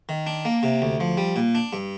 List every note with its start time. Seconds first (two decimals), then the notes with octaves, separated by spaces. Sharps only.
0.09 D#3
0.27 D4
0.45 A#3
0.63 C3
0.82 D2
1.00 F3
1.18 G3
1.36 A#2
1.55 D4
1.73 G2